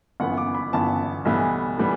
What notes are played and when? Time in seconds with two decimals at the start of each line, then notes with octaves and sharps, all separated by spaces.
0.20 G1 F#2 E3 B3 F#5
0.37 D6
0.55 B5
0.73 G1 F#2 E3 B3 A5
1.25 B1 A2 E3 G3 B3
1.77 A2 E3 G3 B3